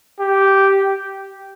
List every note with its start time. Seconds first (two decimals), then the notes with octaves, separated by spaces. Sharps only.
0.20 G4